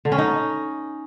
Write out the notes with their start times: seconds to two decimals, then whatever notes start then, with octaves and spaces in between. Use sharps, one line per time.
0.05 D3
0.12 C#4
0.18 D#4